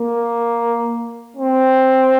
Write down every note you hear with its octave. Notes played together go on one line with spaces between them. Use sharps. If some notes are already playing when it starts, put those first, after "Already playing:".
Already playing: A#3
C4